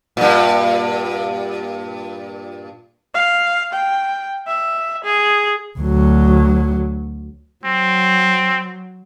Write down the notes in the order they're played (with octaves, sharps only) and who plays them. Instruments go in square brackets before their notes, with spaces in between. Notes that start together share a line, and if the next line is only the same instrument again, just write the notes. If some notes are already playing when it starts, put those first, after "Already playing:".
[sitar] G2 A#2
[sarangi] F5
G5
E5
G#4
[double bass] D2 F#3
[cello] F#3 [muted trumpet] C4